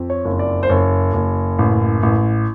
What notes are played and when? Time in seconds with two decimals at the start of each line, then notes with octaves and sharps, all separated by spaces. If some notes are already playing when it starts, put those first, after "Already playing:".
Already playing: F2
0.10 C#5
0.25 F#1
0.39 D5
0.63 C5
0.69 F#1 C#5
1.14 F#1
1.59 A1
2.03 A1